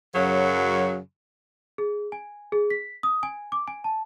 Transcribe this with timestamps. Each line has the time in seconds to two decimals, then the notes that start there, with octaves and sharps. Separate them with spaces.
0.15 F#2 C#3 F#3
1.78 G#4
2.12 G#5
2.52 G#4
2.70 B6
3.03 D#6
3.23 G#5
3.52 D6
3.68 G#5
3.84 A5